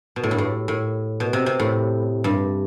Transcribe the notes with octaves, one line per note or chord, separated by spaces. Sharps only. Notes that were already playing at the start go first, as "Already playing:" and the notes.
B2
A2
G2
A2
A2
B2
C3
C3
A2
G2